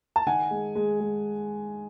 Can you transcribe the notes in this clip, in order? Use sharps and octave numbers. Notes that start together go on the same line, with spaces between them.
A5
D#3 F#5 G#5
G#3
G#3
G#3